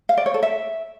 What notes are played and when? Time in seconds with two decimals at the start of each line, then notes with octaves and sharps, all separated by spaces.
0.09 F5
0.17 D5
0.26 C#5
0.34 A4
0.43 E5